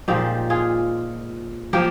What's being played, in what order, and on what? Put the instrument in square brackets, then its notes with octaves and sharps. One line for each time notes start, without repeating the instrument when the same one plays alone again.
[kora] A#2 F3 G#3 D#4 G4
F4 G#4
F3 A#3 G4 A#4